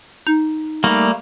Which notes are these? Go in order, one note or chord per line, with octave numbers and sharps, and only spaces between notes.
D#4
G3 A3 A#3